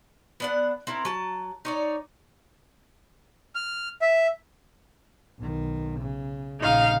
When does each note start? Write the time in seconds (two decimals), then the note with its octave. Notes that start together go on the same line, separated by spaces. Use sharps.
0.40 B3 D4 F#5
0.87 C4 E4 A#4
1.05 F#3 A5
1.65 D#4 C#5 D5
3.55 F6
4.02 E5
5.38 B1 D#3
6.00 C#3
6.61 A#1 C#3 D#4 F5